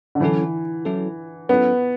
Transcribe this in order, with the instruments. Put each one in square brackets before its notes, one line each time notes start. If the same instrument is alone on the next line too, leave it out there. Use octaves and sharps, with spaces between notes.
[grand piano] D3
[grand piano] E3 [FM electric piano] F#3 C#4 E4 A4
[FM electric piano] F#3 C#4 E4 A4
[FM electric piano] F#3 C#4 E4 A4 [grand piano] B3